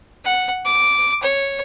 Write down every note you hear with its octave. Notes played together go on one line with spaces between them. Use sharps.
F#5
D6
C#5